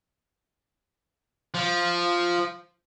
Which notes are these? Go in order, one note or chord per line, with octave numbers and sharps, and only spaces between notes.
F3